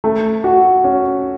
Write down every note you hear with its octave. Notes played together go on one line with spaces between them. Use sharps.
A3
F#4
C#4